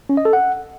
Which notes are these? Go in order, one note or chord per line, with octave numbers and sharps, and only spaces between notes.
C#4
D#5
A4
F#5